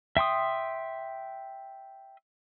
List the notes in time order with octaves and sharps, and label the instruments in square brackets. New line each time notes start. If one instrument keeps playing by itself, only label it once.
[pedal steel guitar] E5 G5 C6 D#6